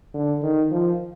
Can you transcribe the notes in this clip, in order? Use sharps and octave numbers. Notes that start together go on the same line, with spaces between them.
D3
D#3
F3